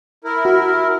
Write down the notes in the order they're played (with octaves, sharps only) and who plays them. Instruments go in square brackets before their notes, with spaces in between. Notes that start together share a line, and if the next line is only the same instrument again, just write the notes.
[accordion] E4 A#4
[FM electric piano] F#4